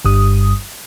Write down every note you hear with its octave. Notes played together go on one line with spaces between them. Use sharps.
G1 G2 G3 D#6